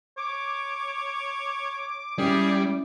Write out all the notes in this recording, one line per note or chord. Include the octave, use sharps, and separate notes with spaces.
C#5 D6
G3 C#4 E4 G#4